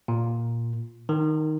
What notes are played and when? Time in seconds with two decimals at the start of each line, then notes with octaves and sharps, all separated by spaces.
0.08 A#2
1.09 D#3